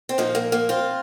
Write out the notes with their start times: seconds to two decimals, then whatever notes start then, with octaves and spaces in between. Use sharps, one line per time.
0.09 C4
0.18 A#2 F3 A#3 D#4
0.35 A#3
0.52 A#3
0.69 C4 F4